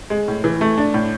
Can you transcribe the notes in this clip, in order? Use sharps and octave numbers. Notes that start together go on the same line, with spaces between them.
G#3
A2
E3
A3
D4
A2